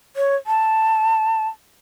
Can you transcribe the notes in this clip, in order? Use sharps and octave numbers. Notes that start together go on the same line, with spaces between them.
C#5
A5